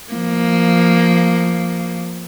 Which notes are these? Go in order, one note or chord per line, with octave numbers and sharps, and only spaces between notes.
F3 A#3